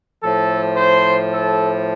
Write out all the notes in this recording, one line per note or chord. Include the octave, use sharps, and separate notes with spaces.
A2 F3 A4
C5
A4